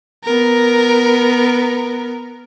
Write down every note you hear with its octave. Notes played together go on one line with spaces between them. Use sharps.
B3 A#4